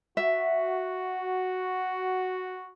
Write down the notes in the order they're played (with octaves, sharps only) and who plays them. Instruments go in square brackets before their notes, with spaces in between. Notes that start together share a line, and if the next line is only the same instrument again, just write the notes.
[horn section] F#4 [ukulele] E5